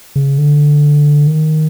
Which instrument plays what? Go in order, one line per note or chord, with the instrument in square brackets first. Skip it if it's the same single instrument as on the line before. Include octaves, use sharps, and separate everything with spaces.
[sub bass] C#3
D3
D#3